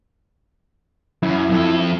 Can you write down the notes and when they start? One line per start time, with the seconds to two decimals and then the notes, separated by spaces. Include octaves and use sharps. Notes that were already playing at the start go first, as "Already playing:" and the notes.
1.23 F#2 E4
1.50 F2 A4